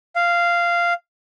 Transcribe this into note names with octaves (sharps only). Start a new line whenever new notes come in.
F5